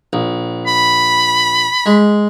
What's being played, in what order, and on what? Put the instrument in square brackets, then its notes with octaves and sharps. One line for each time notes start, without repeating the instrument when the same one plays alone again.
[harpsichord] A#1
[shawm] B5
[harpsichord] G#3